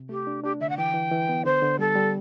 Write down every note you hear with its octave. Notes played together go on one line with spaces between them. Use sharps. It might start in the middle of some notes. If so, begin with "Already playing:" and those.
Already playing: C3
A3 G4
D4
D4 G4
D3 E5
F#5
E3 G5
E3
E3
B3
D3 C5
D3
G3 A4
G3